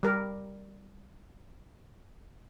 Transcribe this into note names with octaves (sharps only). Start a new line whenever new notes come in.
G3 A#4